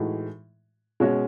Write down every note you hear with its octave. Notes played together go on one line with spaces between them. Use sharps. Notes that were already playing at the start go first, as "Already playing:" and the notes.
Already playing: A2 E3 G#3 D#4 F#4
B2 G#3 C#4 F#4 C#5